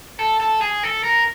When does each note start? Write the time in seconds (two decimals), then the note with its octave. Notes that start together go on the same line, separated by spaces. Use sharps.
0.19 A4
0.40 A4
0.61 G#4
0.83 A4
1.03 A#4